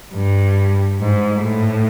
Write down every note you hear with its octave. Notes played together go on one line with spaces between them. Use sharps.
G2
G#2
A2